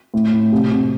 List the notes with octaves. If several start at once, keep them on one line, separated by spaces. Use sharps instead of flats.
A2
A2
C3
C3